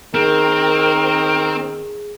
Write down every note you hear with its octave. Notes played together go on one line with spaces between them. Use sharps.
D#3 C4 G#4 A#4